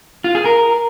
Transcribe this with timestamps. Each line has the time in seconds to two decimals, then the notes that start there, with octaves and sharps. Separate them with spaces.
0.24 F4
0.35 G#4
0.45 A#4